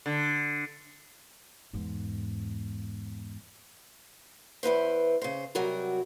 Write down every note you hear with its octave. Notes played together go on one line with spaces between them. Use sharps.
D3
E2 G#2
E2 E4 B4 C5
C#3 C5
C3 F#3 G3 F#4 A#4